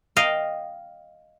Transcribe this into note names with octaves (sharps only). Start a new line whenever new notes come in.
D#5 F5 G5